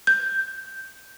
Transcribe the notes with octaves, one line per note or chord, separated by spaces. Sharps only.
G6